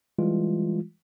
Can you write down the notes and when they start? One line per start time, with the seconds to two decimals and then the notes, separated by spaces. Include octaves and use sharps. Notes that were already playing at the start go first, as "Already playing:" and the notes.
0.19 E3 G3 G#3 F4